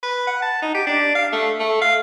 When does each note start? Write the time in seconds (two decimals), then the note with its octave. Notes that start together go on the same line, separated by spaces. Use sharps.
0.03 B4
0.27 F#5
0.42 A5
0.62 D#4
0.75 G4
0.87 D4
1.15 F5
1.33 A3
1.60 A3
1.82 F5